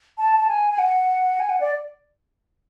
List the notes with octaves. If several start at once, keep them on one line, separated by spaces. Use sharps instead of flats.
A5
A5
G#5
G#5
F#5
G#5
F#5
D5